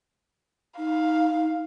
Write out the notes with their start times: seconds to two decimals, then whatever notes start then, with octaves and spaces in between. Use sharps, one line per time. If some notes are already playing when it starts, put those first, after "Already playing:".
0.78 D#4 F5